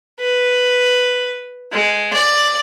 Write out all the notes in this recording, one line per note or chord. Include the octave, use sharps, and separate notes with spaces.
B4
G#3
D5